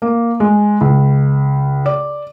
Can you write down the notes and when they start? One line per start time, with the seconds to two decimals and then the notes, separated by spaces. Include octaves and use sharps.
0.02 A#3
0.40 G#3
0.81 C#2
1.86 D5